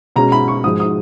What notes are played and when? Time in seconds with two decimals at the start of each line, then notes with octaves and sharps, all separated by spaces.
0.16 B2 G#3 C#4 A#5
0.32 B5
0.48 C#6
0.64 G#2 F3 G#3 D#6
0.80 D#6